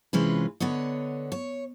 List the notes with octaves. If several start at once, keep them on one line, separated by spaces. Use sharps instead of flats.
C3 E3 G#3 C#4 F4 B4
D3 B3 C#5 D#5
C#5